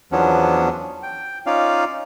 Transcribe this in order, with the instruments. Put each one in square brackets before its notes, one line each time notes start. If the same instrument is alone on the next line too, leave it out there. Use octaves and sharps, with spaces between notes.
[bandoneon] E2 F3 F#3 B3 C#4 D4
G5
C#4 D#4 F4 D5 F5